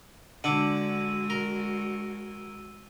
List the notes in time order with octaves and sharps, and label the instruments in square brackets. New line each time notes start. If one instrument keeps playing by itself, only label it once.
[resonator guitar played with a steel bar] D3 [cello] G#3 F#4 [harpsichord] F#5 D6 [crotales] E6 D#7
[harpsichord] A#4 [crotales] G7